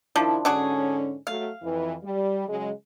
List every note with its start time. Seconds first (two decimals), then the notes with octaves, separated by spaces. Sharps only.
0.16 D#3 F3 D4 E4
0.45 G#2 D3 C#4 D4 F#4 G#4
1.27 F#3 A3 F5
1.63 F2 E3
2.03 G3
2.48 C#3 F#3 G#3